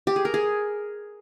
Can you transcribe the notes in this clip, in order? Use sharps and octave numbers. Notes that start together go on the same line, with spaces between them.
G4
G#4
A#4
G#4